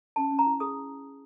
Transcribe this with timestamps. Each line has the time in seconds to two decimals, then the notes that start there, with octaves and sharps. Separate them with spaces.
0.16 C#4 A5
0.31 C#4
0.39 A#5
0.47 E4
0.60 G#4 D#6